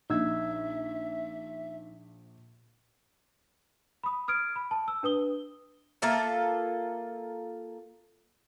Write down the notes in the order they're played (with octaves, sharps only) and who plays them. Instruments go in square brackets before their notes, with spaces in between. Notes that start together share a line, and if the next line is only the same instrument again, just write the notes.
[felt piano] A#1 [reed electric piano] D#4 E6 G#6 [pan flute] E5
[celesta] B5 D#6
D#6 F6 G#6 D7
B5
A5
E6
D4 B4 D#6 G7
[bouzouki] A#3 F4 A4 E5